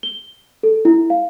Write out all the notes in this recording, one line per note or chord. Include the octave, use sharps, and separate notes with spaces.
G7
A4
E4
F5